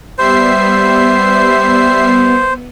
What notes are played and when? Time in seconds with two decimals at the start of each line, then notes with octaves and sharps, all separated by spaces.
0.18 G3 B3 C5 E5 C7